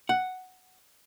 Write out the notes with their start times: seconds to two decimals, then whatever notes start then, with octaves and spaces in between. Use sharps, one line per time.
0.09 F#5